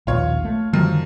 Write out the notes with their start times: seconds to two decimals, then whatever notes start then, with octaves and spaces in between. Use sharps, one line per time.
0.07 A#1 D#2 B2 F4 C#5
0.45 A3
0.73 F#2 D3 D#3 F3 G3